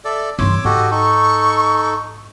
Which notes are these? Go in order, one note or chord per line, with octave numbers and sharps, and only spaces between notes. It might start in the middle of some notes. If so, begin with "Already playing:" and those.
A4 D5 E5
G2 E3 C#5 C6 D6 E6
G#2 F#4 G4 A4 D#5
D#4 A4 C#6